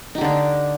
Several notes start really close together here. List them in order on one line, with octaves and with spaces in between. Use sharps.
D#4 G4 D3 D4